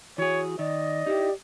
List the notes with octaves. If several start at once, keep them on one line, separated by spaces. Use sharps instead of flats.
E3 F#4 G#4 C#5
D#3 D5 D#5
D#4 E4 G4